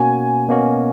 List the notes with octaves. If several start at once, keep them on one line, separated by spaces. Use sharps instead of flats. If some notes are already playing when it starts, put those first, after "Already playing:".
Already playing: B2 A#3 C#4 F#4 G#5
B2 A#3 C#4 F#4